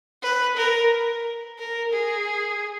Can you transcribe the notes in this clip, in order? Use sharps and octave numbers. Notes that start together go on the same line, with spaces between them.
B4
A#4
A#4
G#4